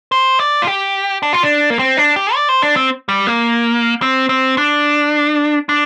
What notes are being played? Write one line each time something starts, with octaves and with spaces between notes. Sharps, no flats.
C5
D5
F4
G4
D4
F4
D4
A#3
C4
D4
G4
D5
C5
D4
C4
G3
A#3
C4
C4
D4
D4